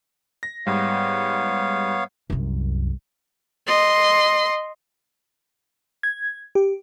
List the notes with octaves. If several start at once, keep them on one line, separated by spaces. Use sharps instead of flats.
A#6
G#2 G3 B3 C#5 F5
C2 F#2
D#5 C6
G#6
G4